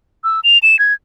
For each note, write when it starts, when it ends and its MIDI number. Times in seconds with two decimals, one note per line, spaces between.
0.24 0.40 88
0.44 0.58 101
0.63 0.79 100
0.79 0.94 92